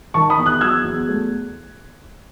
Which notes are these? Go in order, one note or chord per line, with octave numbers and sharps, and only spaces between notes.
D#3 A5 C#6
B5 D#6
E2
D#6 F#6
F#3 E6 G#6
E2
A3